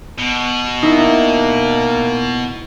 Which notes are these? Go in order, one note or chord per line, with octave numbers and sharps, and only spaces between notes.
B2
A#3 D#4 E4